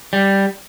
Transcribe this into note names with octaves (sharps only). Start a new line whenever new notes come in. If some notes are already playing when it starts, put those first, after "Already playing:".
G3